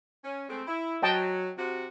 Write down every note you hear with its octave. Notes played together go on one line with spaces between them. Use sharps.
C#4
G#3 A3 C4
E4
F#3 D#5 G5 A5
C3 F#4